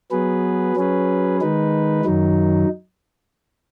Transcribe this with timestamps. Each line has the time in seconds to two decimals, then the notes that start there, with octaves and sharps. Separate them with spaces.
0.11 F#3 B3 G#4 B4
0.76 F#3 C#4 G#4 B4
1.41 D#3 G#3 D#4 B4
2.05 F#2 D#3 F#3 D#4